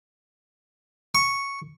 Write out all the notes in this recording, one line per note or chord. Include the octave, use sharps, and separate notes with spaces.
C#6